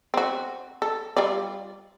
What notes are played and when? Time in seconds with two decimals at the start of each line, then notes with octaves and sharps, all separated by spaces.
0.14 C4 F#4
0.82 A4
1.17 G3 F4 D5